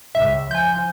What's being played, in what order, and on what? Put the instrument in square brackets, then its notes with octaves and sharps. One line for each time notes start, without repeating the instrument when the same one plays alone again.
[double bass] C#2 [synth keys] E5
[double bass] F3 [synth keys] G#5 G6